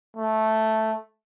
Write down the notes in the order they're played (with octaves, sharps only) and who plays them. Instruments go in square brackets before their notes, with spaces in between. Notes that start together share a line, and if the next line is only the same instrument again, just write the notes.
[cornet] A3